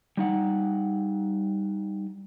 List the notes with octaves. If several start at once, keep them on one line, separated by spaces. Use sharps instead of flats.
G3 D#4 F#5